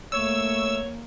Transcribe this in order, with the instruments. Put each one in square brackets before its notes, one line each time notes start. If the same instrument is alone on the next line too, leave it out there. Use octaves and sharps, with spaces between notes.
[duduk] A3 [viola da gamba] A#3 [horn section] C#5 [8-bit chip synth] E6